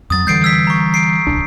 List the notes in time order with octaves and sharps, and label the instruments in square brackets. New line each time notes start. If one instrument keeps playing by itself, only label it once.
[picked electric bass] F2 F#3 [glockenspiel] D#6 A6
[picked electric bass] D3 E3 G3 [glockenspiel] G6 C7 D7
[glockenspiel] E6 G#6 B6
A#5 C#6
C7 D7
[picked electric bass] D1 C2 D4